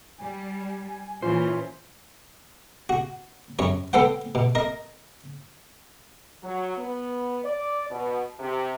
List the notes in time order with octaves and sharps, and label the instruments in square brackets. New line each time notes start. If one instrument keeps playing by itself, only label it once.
[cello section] G3 [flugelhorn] G#5
[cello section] A#2 E3 [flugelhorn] C#4 [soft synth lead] F4 [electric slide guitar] C5
[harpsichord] F#4
F#2 C#5
B3 C4 A4 C5 F#5
B2
A#4 D#5
[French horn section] F#3
B3
D5
B2
C3